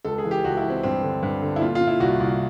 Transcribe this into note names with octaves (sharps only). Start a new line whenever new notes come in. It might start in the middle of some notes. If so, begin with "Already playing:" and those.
C#2 A4
G#4
E3
G4
C#2 F#4
E4
E3
C4
G2 C4
D3
G2
D3
E4
A#2 F4
F4
A#2
E4
C2 F#4
C2